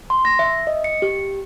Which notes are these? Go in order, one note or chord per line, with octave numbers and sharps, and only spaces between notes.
C6
A#6
E5
D#5
C#7
G4